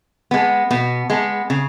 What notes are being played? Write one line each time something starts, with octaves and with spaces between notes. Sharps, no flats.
G#3 B3
B2 B3
G#3 B3
C#3